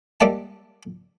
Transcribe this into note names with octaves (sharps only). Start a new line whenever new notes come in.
G3 G#3 A#3 D5 E5 A5